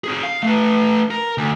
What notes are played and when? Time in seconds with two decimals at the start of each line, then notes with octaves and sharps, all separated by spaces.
0.04 C4 G#4
0.23 F5
0.43 A3 B4
1.11 A#4
1.38 D2